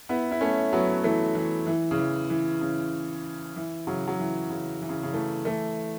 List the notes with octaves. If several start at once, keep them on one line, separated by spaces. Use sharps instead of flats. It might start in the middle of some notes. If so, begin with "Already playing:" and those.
B3 E4
E4
A3 C#4
F#3 B3
E3 A3
E3
E3
C#3
E3
E3
C#3
E3
C#3 F#3
F#3
E3
C#3
E3
C#3
C#3
E3 A3
E3 A3